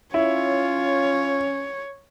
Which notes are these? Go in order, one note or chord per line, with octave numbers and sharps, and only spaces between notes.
C#4 E4 F4 C#5